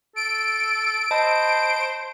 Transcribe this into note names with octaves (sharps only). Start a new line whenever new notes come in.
A4 D7
C5 D#5 A5 B5